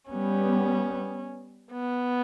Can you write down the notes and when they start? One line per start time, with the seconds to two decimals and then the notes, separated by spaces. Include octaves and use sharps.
0.10 G3 B3 C#4
1.72 B3